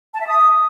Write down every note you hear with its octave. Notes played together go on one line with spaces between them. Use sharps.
A5
E5
D#6